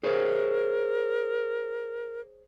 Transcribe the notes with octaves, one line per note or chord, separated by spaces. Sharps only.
G#4 A#4 C5 C#5